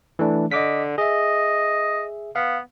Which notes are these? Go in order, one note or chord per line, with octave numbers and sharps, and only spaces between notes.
E3 A3 D4
D3 D#5 D6 B6
G#4 D#5 E5
B3 F5